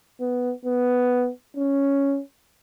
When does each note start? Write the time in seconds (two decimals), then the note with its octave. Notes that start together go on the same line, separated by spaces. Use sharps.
0.20 B3
0.65 B3
1.57 C#4